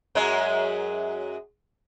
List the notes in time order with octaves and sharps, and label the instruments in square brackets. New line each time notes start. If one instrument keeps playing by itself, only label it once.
[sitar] F#2 F#3 G#3